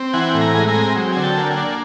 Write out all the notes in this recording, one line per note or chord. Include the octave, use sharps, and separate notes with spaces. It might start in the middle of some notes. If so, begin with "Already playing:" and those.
Already playing: C4
E3 F#5 G#5
A2
G#5 A#5
G#3
G#5 A#5
C4
F#3
D3 G#5
G5 A5
A#3
F#5 G#5
D4